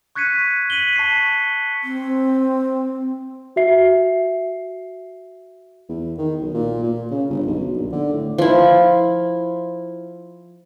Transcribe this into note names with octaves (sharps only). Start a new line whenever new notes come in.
C#6 F#6 G#6 B6 C#7 D#7
B6 D#7 F#7 G7
A5 C#6 B6 C7 D#7
C#7
C4
F#4 E5 C7
E2
D#3
B1
A#2
A#2
C#3
G1
B1
A#1
D3
A2
F3 E4